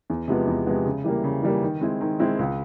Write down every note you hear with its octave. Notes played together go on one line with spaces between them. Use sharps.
E2
C3 F3 G#3 B3
E2
C3 F3 G#3 B3
C#3
E3 G3 A#3
C#3
E3 G3 A#3
D#3
G#3 C4 E4
D#3
G#3 C4 E4
C#2